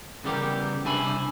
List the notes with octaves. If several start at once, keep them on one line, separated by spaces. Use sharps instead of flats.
C#3 E3 G3 B3 G4 A#4
C2 D4 E4 G#5 B5